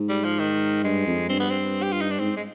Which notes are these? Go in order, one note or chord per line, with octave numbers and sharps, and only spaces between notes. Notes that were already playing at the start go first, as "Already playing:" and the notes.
Already playing: G#2
G3
F3
D#3
G2 G#3
F2
G2 C4
B3
C4
G4
F4
D#4
D4
G#2 C4
G#3